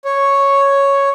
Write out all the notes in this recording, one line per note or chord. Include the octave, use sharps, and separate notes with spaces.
C#5